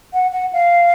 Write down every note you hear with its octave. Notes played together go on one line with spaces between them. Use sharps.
F#5
F#5
F5